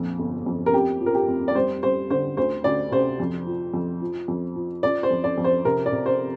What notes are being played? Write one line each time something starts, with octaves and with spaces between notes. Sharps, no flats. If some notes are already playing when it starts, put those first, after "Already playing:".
Already playing: A#1 F2
G1
F2
A#4
F1 G4
F3
A#4
G4
F1
D5
G3 C5
G3 C5
D3 C5
D2 C5
D2 D5
C3 C5
F2
F3
F2
F3
F2
F3
F3 D5
C5
F2
D5
F2
C5
C3 A#4
D5
C3
C5